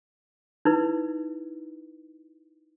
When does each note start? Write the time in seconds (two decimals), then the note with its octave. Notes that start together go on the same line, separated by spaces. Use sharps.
0.65 D#4 E4 B4